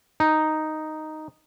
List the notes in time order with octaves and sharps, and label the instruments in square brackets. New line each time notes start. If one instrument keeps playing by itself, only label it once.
[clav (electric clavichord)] D#4